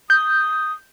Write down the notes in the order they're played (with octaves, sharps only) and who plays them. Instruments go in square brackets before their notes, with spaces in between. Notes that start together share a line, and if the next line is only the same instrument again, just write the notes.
[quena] D#6 [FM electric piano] G6